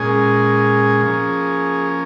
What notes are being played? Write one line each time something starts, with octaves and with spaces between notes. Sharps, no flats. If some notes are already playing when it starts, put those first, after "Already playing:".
Already playing: A#2 G#3 C#4 G#4
F3 A#3 C#4